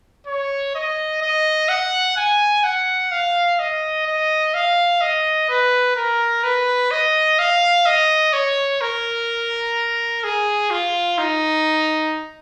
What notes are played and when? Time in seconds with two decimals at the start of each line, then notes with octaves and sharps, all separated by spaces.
0.27 C#5
0.75 D#5
1.22 D#5
1.69 F#5
2.17 G#5
2.63 F#5
3.11 F5
3.59 D#5
4.07 D#5
4.54 F5
5.01 D#5
5.49 B4
5.96 A#4
6.44 B4
6.91 D#5
7.39 F5
7.86 D#5
8.33 C#5
8.81 A#4
10.24 G#4
10.71 F4
11.18 D#4